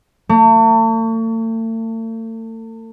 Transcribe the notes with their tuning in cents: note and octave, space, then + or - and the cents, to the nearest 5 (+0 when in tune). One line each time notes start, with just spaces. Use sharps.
A3 +40